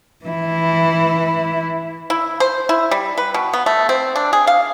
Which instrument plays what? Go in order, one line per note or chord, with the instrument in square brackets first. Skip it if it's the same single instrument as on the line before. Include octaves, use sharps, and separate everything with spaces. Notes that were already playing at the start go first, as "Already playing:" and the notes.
[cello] E3 E4
[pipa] E4
C5
E4
G3
B4
B2
B3
A3
C4
D4
G#4
F5